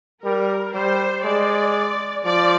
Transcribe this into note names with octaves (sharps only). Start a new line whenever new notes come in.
G3 A#4
G3 C5
G#3 D5
F3 D5